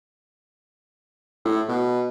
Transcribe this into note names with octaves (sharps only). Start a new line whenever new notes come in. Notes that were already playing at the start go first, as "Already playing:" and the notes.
A2
B2